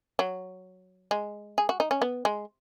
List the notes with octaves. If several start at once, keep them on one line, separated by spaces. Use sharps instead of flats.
F#3
G#3
G#4
F#4
D#4
C#4
B3
G#3